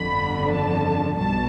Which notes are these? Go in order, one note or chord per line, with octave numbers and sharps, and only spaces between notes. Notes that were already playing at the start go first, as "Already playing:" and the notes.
Already playing: G1 F2 D3 B5
A5
B1 B2 G3 A5